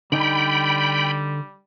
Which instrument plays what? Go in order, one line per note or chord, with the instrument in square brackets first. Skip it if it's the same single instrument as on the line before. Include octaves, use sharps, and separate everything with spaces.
[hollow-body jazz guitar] D3 D#4 [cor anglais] G3 [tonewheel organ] G5 B5